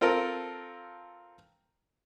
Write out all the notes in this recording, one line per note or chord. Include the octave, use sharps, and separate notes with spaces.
C4 F4 A4 A#4